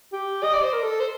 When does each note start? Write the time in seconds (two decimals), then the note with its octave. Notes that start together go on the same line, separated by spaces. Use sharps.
0.12 G4
0.43 D#5
0.53 D5
0.63 C5
0.73 A#4
0.82 A4
1.00 C5